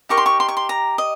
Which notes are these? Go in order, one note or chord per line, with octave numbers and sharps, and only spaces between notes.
D#4 G4 A#4 C#6
C6
C#6
C6
C#6
C6
A#5
D#5